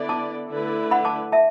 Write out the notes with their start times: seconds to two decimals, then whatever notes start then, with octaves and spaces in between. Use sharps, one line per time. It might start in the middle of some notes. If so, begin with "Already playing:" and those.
Already playing: D3 B3 E4 D5
0.09 A5 D6
0.50 D3 A3 E4 B4 D5
0.91 F#5 B5
1.05 A5 D6
1.32 E5 A5